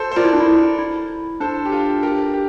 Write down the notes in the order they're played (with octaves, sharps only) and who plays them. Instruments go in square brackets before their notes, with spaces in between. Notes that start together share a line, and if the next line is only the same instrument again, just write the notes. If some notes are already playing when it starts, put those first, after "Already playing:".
Already playing: [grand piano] A4 C5
C5
[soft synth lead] F4 [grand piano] A#4 D5
[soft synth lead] E4
D4
E4
E4
[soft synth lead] D4 [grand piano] A4 C5
[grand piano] G4
F4 A4
G4 A#4
G4